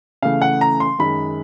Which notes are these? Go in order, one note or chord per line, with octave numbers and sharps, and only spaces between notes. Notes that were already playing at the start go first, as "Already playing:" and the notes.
C#3 E3 A3 F5
F#5
A#5
C6
F#2 D#3 G#3 B5